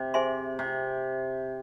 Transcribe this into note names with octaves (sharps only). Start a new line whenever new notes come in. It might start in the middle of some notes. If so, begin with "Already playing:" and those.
Already playing: C3
G#4 C5 E5 G#5 C6
C3